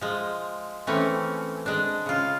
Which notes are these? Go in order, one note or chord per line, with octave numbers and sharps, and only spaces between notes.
F3 G#3
E3 A3 C4 C#4
G#3 D4
C#3 F4